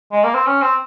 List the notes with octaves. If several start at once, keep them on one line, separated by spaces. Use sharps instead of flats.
G#3
A#3
C4
C#4
C4